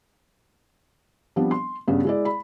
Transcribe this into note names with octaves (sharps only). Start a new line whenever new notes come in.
F3 G3 B3 C4 D4
C6
G2 C#3 B3
G#3 E4 D5
B5